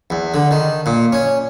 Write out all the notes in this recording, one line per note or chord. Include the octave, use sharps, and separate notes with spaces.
E2
D3
D#3
A#2
C#4